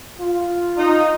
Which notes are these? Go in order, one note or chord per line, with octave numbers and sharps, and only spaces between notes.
F4
D#4